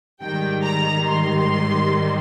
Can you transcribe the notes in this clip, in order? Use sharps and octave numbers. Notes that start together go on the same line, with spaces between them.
G#2 D#3 G3 G5
A#5
C6